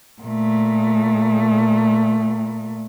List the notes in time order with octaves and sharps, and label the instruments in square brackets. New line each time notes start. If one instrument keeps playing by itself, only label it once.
[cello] A#2 A3